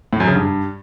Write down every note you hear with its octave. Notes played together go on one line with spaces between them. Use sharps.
A2
F#2
C#3
G2